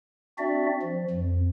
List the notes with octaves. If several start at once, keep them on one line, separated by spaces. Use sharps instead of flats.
C4 D4 F#4 D5 E5
F3
F2